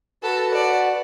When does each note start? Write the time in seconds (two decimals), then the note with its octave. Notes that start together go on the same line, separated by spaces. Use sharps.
0.23 F#4 A4 B4 F#5 A5
0.54 D5